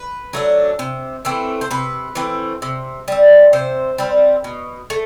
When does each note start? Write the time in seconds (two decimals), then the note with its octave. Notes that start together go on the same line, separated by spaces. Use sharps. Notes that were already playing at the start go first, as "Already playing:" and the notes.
Already playing: B4
0.33 F#3 A3 D4
0.79 C3
1.25 E3 A3 C4
1.61 C5
1.71 C3 B4
2.15 E3 A3 C4
2.62 C3
3.08 G3 C4
3.53 C3 C5
3.98 G3 C4
4.44 B2
4.90 A3